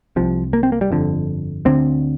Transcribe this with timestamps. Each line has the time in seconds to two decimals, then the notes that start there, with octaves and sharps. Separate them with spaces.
0.16 C2 C3 F3
0.53 A#3
0.63 C4
0.72 A#3
0.81 G3
0.91 G1 F2 D3
1.65 D2 D3 C4